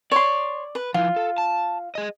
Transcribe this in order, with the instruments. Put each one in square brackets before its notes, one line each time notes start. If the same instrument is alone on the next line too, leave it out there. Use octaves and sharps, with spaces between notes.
[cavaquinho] C#5 C6 [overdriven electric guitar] D5
[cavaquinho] B4
[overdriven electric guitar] F3 E4 [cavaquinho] F4
[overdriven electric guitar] A4
A5
G#4 D#5